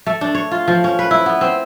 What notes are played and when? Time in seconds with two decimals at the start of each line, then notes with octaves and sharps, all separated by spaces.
0.06 A3
0.21 D4
0.35 C#5
0.51 F4
0.68 F3
0.84 C#4
0.99 B4
1.11 E4
1.26 B3
1.41 C4